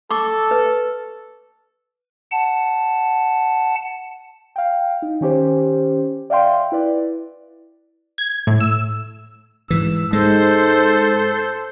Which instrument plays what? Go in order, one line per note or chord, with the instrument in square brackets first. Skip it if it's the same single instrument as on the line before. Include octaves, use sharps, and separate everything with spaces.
[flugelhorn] A4 [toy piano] C#6 D6
[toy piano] B4
[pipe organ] F#5 A5
[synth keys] F5 G5
D#4
D#3 C#4 G4 C5
D5 E5 F5 G5 C6
E4 B4 D5
[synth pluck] G#6
A2
E6
[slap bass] G#2 E3 [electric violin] E6
[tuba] G#2 [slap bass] G#3 [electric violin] A4 C5